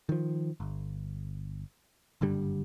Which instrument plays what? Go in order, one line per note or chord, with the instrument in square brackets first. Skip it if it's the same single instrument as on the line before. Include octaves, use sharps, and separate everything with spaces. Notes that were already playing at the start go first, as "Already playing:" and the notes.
[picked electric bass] D#3 F3
G1
F#1 G2 D3 G3